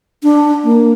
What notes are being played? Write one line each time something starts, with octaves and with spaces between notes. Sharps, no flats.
D4
A#3